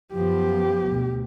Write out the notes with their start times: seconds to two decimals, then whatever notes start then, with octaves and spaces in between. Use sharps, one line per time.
0.14 F#2 F3 B3 G4
0.89 D2 B2